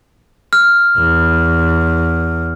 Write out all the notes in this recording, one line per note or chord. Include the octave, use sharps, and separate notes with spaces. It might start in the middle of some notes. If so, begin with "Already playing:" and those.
F6
E2